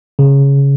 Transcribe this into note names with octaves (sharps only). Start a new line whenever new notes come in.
C#3